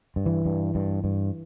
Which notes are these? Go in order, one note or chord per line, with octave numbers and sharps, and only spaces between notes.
G2
E3
G2
G2
G2